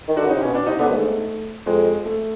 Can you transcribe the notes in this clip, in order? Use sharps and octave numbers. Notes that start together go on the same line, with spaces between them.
D#3
D3 F#4
C#3
D#4
C3
B2 C#4
B2 D4
C3 D#4
D3 B3
G2
G#2 A3
F2 G#3
A3